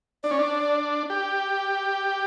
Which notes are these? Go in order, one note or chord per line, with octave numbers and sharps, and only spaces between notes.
D4 D5
C#4
D4
G4